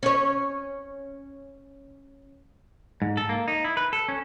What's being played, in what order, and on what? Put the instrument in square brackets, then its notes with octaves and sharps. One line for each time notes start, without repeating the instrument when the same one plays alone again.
[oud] C#4 C#5
[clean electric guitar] G#2
A4
A#3
D#4
E4
B4
A4
C#4